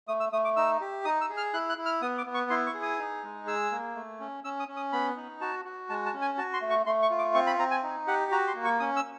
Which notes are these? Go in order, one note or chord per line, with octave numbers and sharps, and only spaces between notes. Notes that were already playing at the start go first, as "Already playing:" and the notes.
A3 D#6
E6
A3 D#6
D6
D#4 E6
G4
D#4 D#6
E6
G#4
F6
E4 F#6
F#6
E4
F6
B3 D#6
D6
B3
C#6
E4 C6
C#6
G#4
D#6
D#4
G#3
G#4 E6
A#3
A3
C#4
C#4 E6
D#6
C#4
D#6
B3 B5
D#4
F#4 A5
F#4
G#3 A5
A5
C#4
G#5
F#4 A5
C6
A3
C#6
A3 C6
C#6
F4
D6
C4 C#6
B5
C4 A#5
G#5
D#4
G4 F#5
F#4 A#5
C6
A#3
C#6
C#4 D#6
E6